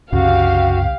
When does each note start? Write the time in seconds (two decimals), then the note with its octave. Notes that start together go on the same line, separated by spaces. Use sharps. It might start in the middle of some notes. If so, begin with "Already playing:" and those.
0.13 C2 F#2 C#3 F#4 G4 F5